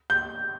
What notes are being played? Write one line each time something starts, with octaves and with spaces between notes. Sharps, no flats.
G6